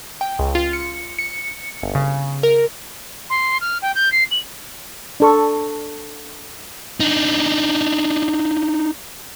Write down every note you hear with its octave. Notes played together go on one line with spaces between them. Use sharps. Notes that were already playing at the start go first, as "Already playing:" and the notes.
G5
C#2
F4
C#7
C#7
G1
C#3
A#4
C6
F6
G5
G6
C7
F#7
D4 A4 C#6
D4 D#4